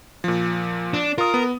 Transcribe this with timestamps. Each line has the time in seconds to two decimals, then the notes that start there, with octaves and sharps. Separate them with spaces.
0.24 A#2 F3
0.94 D4
1.18 F4 A#4 D#6
1.34 B3